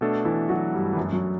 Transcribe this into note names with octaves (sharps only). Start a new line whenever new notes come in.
B2 A3 D4 A4
E3 E4
F#3 F#4
G2 G3
E3
F#2 F#3
F#2 F#3